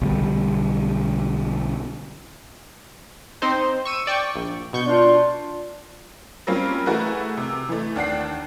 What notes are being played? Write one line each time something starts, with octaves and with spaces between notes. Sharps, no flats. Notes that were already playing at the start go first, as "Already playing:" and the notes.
B1 D3 G3
C4 D#4 C5
C#6 E6 D#7
D5 G5 C#6
A#1
B2 C#6 G6
D4 F4
F#3 G3 A#3 C4 C#4 F4
E3 A3 F#4 G#4 A#4 B4
C3
E3 A3
D#2 D4 F#5 C7